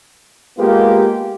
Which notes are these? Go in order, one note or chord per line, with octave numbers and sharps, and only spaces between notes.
G#3 A#3 B3 F4 G4